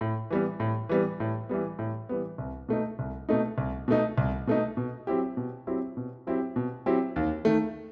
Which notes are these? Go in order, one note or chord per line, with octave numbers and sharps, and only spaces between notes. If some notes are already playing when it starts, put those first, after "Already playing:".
A2
E3 G3 B3
A2
E3 G3 B3
A2
E3 G3 B3
A2
E3 G3 B3
C2
B2 A3 D#4
C2
B2 A3 D#4
C2
B2 A3 D#4
C2
B2 A3 D#4
B2
F#3 C4 E4 G4
B2
F#3 C4 E4 G4
B2
F#3 C4 E4 G4
B2
F#3 C4 E4 G4
D#2
D#3 A3